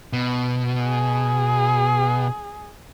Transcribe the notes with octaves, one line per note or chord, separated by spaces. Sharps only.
B2
G#4